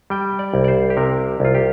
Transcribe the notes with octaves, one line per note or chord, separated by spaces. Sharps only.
G3 G5
D5
C2
D5
C5
G4
C3 A#4
C2 F4
G4